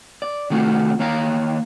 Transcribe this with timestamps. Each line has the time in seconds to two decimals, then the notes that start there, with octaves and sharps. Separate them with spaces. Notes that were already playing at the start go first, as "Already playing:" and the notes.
0.22 D5
0.50 C3 D#3 A3 F4 F#4
0.99 D#2 A#3 C#5 F5 A5 A#5